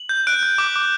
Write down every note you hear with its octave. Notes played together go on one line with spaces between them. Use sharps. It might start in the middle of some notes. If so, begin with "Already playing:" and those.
Already playing: F#7
G6
F#6 D7
F#6
D6
D6